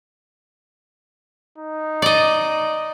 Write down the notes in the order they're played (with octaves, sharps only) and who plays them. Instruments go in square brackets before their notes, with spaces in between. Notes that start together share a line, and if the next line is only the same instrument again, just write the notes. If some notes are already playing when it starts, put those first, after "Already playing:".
[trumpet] D#4
[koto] D5 D#5